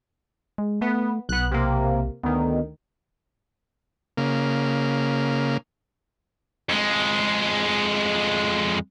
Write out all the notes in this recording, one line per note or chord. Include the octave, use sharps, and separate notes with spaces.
G#3
A3 B3
B1 B3 F#6
C3 A#3
D2 D#3 B3
C#3 A#3
F2 G#3